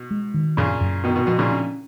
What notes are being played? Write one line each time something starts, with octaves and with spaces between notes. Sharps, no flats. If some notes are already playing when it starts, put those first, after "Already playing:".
Already playing: B2
G#3
D#3
F#2 A#2 C#3
F#2
B2 D#3 B3
B2
B2 F3
A#2 C#3
C#4